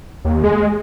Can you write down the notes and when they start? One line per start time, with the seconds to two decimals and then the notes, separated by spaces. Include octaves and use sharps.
0.24 D#2
0.44 G#3